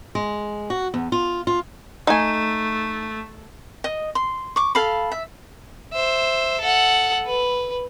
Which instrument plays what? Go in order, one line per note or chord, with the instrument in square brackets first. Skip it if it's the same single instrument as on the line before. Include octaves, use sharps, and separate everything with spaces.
[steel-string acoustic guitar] G#3
F#4
E2
F4
F4
[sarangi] A3 [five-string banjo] D#4 G#5
[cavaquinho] D#5
C6
C#6 D6
A4 F5 B5
E5
[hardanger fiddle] C5 E5
A4 F#5
B4